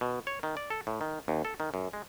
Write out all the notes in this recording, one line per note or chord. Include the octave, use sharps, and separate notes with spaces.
B2
C#5
D#3
D5
A4
A2
D#3
D#2
A4
D#3
F#2
G#3